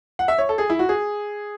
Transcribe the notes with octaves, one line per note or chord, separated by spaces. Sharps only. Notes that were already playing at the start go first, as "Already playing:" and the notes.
F#5
E5
C#5
A4
G#4
E4
F#4
G#4